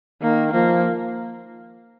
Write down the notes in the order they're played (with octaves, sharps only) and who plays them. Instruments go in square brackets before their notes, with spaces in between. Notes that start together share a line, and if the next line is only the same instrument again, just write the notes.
[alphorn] D#3 [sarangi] A#3
[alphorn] F3 [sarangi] A#3